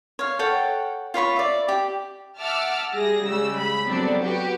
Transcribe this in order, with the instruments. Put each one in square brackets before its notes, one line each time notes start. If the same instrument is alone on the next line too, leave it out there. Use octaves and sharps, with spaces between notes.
[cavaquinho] C#5 F5
A4 C#5 F#5 G5
F4 C#5 B5 C#6
D5 E5
G4
[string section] E5 F#5 A5 D6 E6 F6
G3 G#4 A#6
C#3 G3 G#3 E6
B5
F#3 B3 C4 D4 A4 D5
F#4 G4 B4